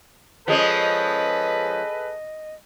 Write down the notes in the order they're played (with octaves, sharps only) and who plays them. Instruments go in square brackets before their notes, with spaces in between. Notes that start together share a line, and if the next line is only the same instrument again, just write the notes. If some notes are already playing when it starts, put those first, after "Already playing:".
[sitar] F3 G#3 C#4 [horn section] G#4 A4 B4 [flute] D#5